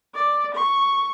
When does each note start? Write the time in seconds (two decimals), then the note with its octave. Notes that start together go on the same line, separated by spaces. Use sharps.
0.15 D5
0.54 C#6